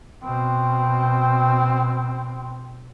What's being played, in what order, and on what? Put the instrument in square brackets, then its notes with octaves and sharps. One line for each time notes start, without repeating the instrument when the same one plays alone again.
[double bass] B2 C4